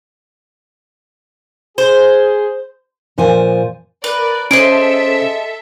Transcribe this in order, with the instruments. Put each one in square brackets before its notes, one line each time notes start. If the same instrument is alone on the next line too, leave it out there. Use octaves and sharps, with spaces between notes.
[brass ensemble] G#4 [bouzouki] C5
[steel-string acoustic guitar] A#2 F3 C5 D5 G#5
[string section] A#4 D5 [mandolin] B4
[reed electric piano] C#4 C5 [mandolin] G#4 D#5 C6 [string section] A4 E5 [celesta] D7